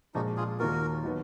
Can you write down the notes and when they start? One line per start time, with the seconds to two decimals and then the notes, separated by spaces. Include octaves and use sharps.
0.14 A#2 F3 G#3 D4 D#4 F#4
0.37 F4 G#4
0.59 D#2 D#3 A#3 F4 F#4 A#4
1.04 D#3 F#3 B3